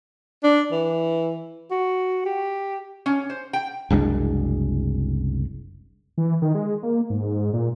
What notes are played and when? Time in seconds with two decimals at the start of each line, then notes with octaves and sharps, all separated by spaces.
0.44 D4
0.72 E3
1.71 F#4
2.26 G4
3.06 C#4
3.30 C5
3.53 G5
3.90 F#1 C2 G#3 D4
6.18 E3
6.42 D#3
6.55 G#3
6.83 A#3
7.10 G#2
7.53 A#2